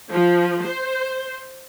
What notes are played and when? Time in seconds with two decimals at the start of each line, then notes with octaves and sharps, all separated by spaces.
0.11 F3
0.64 C5